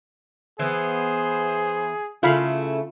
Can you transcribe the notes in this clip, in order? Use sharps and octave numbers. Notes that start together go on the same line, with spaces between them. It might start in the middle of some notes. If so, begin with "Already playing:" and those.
E3 B3 G#4 C5
C#3 A3 E4 F4 F5 B5